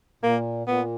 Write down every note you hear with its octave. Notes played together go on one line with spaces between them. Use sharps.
A#2 A#3
A#2 B3